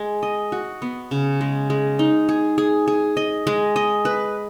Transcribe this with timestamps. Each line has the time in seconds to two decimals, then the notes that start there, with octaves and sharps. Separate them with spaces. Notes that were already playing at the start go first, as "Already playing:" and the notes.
Already playing: G#3
0.23 D#5
0.52 F#4
0.82 B3
1.11 C#3
1.41 G#3
1.70 G#3
1.99 D#4
2.29 G#4
2.58 G#4
2.88 G#4
3.17 D#5
3.47 G#3
3.76 D#5
4.05 B4